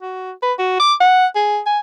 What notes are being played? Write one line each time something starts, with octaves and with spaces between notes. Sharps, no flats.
F#4
B4
F#4
D6
F#5
G#4
G#5